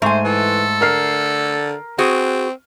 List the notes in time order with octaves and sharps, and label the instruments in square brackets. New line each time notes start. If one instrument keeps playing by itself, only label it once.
[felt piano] G#2 C6 [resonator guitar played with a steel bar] A3 G#5 [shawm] C5
[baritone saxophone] E3 [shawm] A4
[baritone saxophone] D3 [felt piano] A#4 F6 C7
[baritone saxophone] C4 [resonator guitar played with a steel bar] F#4 G#4